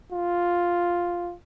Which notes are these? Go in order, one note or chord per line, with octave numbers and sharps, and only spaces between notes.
F4